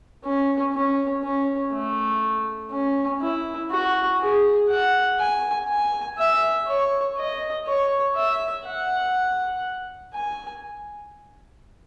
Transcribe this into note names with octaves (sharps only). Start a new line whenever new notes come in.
C#4
C#4
C#4
A3
C#4
E4
F#4
G#4
F#5
G#5
G#5
E5
C#5
D#5
C#5
E5
F#5
G#5